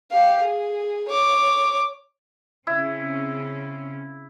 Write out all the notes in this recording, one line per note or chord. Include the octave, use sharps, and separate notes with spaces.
G4 F5
G#4
C#5 D6
C#3 C4 C#4 E4